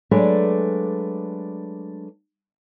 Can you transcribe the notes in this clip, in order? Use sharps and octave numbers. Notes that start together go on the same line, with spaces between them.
F#3 G#3 A3 D4 B4 D5